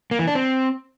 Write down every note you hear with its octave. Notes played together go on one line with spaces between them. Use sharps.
A#3
E3
D4
C4